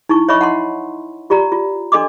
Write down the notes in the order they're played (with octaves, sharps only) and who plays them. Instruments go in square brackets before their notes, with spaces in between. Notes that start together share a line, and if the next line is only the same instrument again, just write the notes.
[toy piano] D#4 E4 C#6
C#5 D#5 E5 B5 C#6
F#5 A5 C6
F4 G4 D5 A#5
F4
D4 A4 D#5 C6 D6